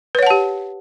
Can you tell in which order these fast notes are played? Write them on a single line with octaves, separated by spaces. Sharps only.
B4 C#5 F#5 A5 G4